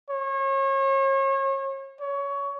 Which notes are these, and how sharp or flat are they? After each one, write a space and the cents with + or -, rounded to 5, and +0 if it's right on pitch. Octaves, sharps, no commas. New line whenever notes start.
C#5 -35
C#5 +20